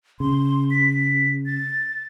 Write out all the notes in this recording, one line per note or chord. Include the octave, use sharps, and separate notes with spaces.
C#3 C6
B6
A6